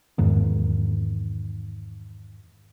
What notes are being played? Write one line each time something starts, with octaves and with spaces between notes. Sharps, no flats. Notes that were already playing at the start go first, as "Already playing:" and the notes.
E2 G#2 D#3